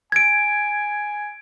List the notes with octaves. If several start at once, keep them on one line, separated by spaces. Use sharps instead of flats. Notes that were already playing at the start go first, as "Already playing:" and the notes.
G#5 G#6 D7